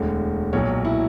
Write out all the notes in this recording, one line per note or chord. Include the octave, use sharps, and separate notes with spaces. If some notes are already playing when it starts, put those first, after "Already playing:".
Already playing: E1 D2 D3
B1 A#2 F#3 C#5
E4